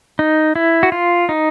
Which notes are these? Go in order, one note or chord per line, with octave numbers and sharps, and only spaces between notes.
D#4
E4
F#4
F4
D#4